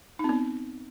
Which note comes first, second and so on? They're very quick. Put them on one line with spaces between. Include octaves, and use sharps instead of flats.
D#4 C4 B3